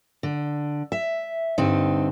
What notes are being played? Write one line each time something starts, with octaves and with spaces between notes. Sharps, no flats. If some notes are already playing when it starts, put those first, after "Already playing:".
D3
E5
G2 D3 C4 D#4